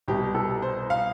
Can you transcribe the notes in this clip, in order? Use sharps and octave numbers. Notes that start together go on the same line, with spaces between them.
C2 B2 G4
A4
C5
F5